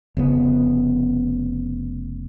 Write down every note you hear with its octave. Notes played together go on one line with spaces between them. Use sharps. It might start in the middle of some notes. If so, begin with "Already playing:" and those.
F1 C#3 B3